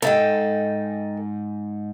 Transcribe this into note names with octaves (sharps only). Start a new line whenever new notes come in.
G#2 A4 D#5 G5